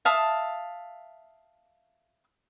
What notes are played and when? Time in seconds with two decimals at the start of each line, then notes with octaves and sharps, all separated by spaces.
0.05 E5 F5 A5 D#6